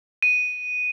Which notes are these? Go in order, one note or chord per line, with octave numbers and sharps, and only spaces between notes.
D#7